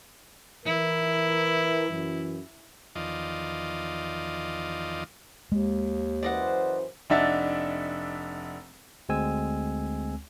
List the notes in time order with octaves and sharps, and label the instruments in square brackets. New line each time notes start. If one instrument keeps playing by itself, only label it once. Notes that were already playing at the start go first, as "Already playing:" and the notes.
[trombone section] E3 A#4 [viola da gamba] E4
[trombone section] F#2 E3
[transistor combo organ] E2 D#3 F3 F4 D5 D#5
[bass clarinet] D#2 [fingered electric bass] G#3
[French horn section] F#2 E3 C5 [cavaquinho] D5 D#5 F#5
[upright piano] F1 D4 D#4 E5 F#5 A6
[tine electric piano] D2 G#3 C4 G#5 E6